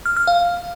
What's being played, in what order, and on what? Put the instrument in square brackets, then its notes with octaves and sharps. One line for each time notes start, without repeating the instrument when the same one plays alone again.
[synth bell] F6
F6
F5